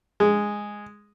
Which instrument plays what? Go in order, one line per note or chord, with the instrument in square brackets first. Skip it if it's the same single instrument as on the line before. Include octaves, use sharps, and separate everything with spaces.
[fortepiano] G#3